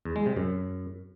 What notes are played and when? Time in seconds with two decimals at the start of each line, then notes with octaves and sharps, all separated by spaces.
0.05 E2
0.16 G#3
0.26 C3
0.36 F#2